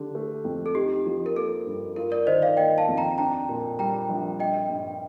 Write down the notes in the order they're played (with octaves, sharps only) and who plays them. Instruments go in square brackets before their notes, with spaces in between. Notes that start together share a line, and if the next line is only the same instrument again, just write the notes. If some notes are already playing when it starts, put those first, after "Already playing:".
Already playing: [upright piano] D3 D4 [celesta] G4
[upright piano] A3
F2
[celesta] A4
[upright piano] D#4 [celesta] G4
[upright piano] F3
[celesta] A#4
[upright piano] A#3 [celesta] A4
[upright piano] G2
[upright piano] F4 [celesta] A#4
[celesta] A#4 D5
[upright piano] D#3 [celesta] C5 D#5
[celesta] D5 F5
[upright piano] A#3 [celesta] D#5 G5
[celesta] F5 A5
[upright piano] F2
[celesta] G5 A#5
[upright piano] D4 [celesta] G5 A#5
[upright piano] A#2
[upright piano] G3 [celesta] G5 A#5
[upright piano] A#1
[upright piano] G3 [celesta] D#5 G5
[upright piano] G2